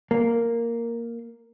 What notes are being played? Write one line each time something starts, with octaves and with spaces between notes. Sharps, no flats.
A#3